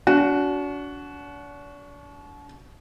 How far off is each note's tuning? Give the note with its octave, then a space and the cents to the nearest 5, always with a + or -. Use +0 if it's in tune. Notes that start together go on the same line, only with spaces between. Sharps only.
D4 -40 F#4 +0